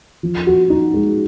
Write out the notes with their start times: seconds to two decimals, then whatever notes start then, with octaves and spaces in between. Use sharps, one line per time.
0.23 F3
0.47 F#4
0.70 D#4
0.94 G#3